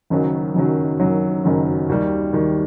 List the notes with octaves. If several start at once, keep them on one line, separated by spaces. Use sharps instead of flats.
F#1 F#2 D#3 F#3
F#1 F#2 D#3 F#3
F#1 F#2 D#3 F#3
F#1 F#2 D#3 F#3
D#2 D#3 G3
D#2 D#3 G3